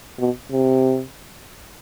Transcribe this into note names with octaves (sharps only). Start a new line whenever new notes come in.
B2
C3